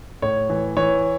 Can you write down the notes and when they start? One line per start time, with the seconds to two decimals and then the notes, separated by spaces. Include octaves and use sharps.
0.22 A2 C#5
0.50 E3
0.77 E3 C#5